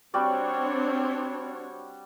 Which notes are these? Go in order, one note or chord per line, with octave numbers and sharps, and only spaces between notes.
G3 C4 D4 F#4 C#5 D5